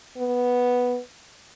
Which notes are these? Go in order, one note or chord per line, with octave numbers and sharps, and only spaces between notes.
B3